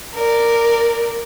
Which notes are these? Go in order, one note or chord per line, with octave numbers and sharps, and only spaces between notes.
A#4 D5